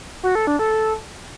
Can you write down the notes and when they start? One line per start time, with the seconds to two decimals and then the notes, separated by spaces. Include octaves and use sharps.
0.23 F#4
0.35 A4
0.47 D4
0.59 A4
0.71 A4